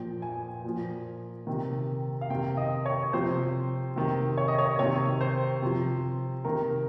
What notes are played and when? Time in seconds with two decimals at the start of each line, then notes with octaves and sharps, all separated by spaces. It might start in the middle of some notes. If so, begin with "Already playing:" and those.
Already playing: A#2 F3 G5
0.22 G#5
0.64 A#2 F3
1.47 C3 D#3
2.21 F5
2.30 C3 D#3 G5
2.57 D#5
2.86 C#5
3.13 C3 F3 C5
3.96 C3 D#3
4.38 C#5
4.48 D#5
4.58 C#5
4.79 C3 D#3 C#5
5.21 C5
5.62 C3 F3
6.45 C3 D#3 A#4